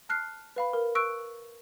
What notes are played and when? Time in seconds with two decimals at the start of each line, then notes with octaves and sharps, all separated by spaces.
0.09 A5 F6 F#6 C7
0.56 B4 F5 B5
0.73 A#4
0.95 C#6 E6 F#6 D7